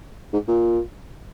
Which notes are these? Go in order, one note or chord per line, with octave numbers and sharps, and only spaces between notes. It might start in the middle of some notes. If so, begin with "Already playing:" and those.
G#2
A#2